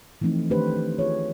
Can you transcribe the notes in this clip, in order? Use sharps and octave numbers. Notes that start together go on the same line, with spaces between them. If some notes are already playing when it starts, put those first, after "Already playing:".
E3 F3 A3 C4 D#4
D#3 A3 D4 G4 B4 C5
F4 G#4 C#5